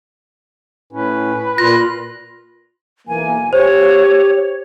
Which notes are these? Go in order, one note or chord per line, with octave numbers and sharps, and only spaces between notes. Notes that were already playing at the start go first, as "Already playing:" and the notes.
A2 C#4 B4
A#2 F4 A#6
B1 E3 A#3 G#5
G4 C5 C#5